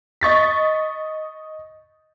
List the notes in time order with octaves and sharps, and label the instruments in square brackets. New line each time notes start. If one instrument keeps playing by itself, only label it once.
[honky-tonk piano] D#5 C#6 A6 B6